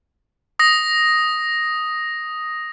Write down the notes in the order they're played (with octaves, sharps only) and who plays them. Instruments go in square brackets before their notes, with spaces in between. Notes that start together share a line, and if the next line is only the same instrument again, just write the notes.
[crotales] D#6 A#6